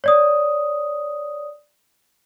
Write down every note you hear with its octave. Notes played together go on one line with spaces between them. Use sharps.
C#5 D5 D#6